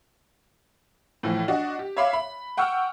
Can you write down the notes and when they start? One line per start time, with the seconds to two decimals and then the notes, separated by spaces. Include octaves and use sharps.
1.23 A2 E3 F3
1.48 D4 F#4 D#5
1.79 G4
1.97 C#5 E5 F5 B5 C6 D6
2.13 B5
2.57 F#5 G5 C#6 E6 F6